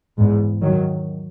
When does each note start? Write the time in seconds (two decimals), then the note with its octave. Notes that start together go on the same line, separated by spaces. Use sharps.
0.19 E2 G#2
0.62 D#3 F#3